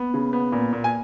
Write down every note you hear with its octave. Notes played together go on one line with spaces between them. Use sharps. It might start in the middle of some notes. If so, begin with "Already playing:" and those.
Already playing: B3
C#3
B3
A#2
A#2
G#5